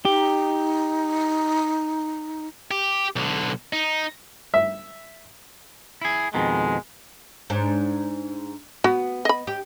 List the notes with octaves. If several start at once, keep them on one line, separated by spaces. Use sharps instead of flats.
D#4 G4
G4
B1 D3
D#4
E5
E4 G#4
F2 B2 D#3 G#3
G#2 D4
B3 F#4
D#5 B5
G4